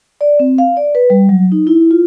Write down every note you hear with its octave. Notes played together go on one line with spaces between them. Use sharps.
D5
C4
F5
D5
B4
G3
F#3
D#4
E4
F4